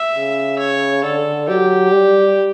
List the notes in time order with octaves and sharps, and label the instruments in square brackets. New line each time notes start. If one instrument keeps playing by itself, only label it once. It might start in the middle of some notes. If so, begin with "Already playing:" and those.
Already playing: [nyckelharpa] E5
[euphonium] C#3
[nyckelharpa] C#5
[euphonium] D3 [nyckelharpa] A4
[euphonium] F#3 [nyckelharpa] G4
[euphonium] G3